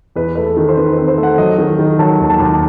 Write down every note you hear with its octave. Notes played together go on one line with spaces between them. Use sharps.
E2 B4
A3 B4
A4
D#3
C5
D#3 B4
B4
C4
C5
A3
F#5
F#3 D#5
D#3
D#3
F#3 A5
D#2
A5
D#2